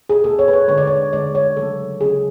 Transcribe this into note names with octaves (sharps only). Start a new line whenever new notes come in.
G#4
B2 A3 A4
C#5
B4
C#5
D3 G#3 C#5
D5
C#5
D3 G#3 D5
C#5
C#3 F#3 A3 A4
C#3 F#3 A3 G#4